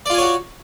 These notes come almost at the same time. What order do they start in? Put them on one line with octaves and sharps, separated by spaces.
D5 F4 G#5 C#5 F#4